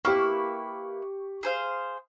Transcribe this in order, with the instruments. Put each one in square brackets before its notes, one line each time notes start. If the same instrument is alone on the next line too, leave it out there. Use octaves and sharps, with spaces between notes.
[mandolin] A#3 E4 B4 [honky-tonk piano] G4 C#6
[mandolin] G#4 C5 F5